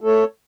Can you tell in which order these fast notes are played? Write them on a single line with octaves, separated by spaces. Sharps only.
A3 A4 C#5